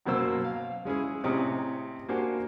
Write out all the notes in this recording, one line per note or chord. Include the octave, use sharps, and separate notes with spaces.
F#2 B2 F#3 A#3 C5 E6
F5
G#3 C#4 E4 G#4
A2 C3 C#4 D#5 A#5 D#6
A#3 D4 F#4 G4 C5 G#5